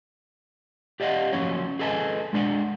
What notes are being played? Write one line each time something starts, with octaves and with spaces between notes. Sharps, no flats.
G4 D5 D#5 F5 F#5
F3 F#3 A#3 C#4 C#5
G#4 A4 B4 D#5 G#5 A5
G#3 D4 D5 F#5